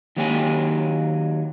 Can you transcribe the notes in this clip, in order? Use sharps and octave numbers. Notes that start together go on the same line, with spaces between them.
D#3 F#3 A#3 G4 G5 G#5